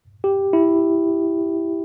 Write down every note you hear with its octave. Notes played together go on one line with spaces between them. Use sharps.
G4
E4